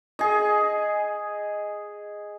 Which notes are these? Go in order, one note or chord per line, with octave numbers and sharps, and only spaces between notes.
G#4 D#5